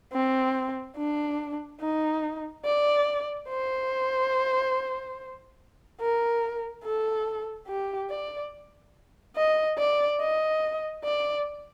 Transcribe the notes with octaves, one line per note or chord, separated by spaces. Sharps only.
C4
D4
D#4
D5
C5
A#4
A4
G4
D5
D#5
D5
D#5
D5